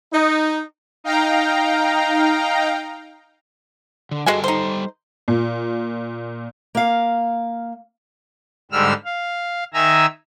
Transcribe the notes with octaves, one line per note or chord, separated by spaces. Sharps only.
D#4
D#4 F5 G5 A#5
D3
G3 G#3 F#4 A4 G#5
D#4 C5
A#2
A#3 F5
G#2 D3 G3 E6 F6
F5
D#3 E5 G#5 A#5 E6